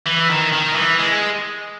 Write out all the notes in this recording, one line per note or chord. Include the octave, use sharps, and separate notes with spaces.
E3
D#3
D#3
E3
G#3